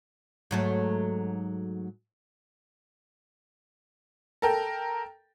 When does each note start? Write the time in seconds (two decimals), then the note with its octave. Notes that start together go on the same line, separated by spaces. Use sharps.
0.51 G#2 F#3 A3
4.42 A4 A#4 G5